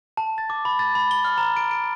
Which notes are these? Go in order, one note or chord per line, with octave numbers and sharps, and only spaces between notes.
A5
A6
D6
B5
A6
B5
G7
F6
A#5
D7
D7